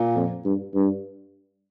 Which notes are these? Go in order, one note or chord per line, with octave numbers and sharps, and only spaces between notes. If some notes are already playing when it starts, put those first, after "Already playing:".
Already playing: A#2
F2
G2
G2